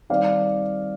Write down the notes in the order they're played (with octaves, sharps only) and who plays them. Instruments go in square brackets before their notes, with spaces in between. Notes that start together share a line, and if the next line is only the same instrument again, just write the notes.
[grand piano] D#3 G3 C4 D5 F5